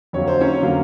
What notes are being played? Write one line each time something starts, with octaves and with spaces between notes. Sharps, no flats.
F2 D3 F#3 A#3 C#5
C5
C#4 C#5
D3 F#3 A#3